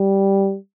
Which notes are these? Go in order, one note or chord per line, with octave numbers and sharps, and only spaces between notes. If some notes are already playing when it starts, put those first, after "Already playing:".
Already playing: G3